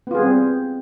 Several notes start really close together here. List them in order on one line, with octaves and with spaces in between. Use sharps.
B3 F4 G#4 G3 C4